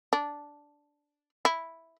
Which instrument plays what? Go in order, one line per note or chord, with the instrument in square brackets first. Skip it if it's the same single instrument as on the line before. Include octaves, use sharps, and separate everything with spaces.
[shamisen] D4
E4